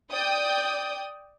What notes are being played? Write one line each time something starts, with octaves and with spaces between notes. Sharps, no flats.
D5 G5 D#6 G6